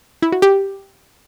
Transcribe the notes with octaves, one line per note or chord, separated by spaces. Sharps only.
E4
F#4
G4